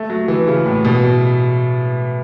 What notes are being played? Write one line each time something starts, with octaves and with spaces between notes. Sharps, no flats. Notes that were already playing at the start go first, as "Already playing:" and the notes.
Already playing: A3
F#3
E3
C#3
A2
B2